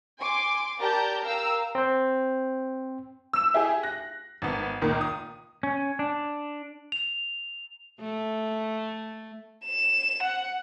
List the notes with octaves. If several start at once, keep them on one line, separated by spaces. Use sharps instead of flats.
G#5 C6 D6
G4 A#4 D5 A5 A#5 G6
A#4 F5 G5 A#5 E6
C4 C5
E6 E7
E4 G4 G#4
F#6 A#6
G#1 B3
C#2 A#2 D#3 A#3
D#6
C#4
D4
F7
A3
E7
F#5